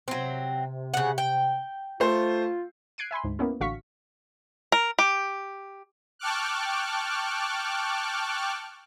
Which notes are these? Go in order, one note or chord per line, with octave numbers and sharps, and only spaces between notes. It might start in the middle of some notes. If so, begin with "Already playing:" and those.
C3 F#3 C4
C#3 F#5
G5
A3 F4 C5
F#6 G#6 C7 D7 D#7
E5 G#5 B5 C6
D2 G#2
A#3 B3 C#4 E4
A1 D3 F#4 F5 C#6 B6
A#4
G4
G5 A5 C#6 D6 F6 F#6